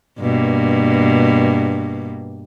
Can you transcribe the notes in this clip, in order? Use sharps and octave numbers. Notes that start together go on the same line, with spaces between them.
G2 B2 A#3